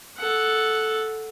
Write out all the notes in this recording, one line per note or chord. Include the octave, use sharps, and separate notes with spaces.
A4 F#5